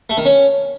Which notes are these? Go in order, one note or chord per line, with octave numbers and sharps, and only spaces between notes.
A3
D#3
C#4